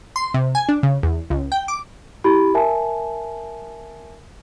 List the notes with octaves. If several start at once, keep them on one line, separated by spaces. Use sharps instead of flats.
C6
C3
G#5
D4
C#3
E2
C#2
G5
D6
E4 G4 B5
A#4 E5 G#5 A5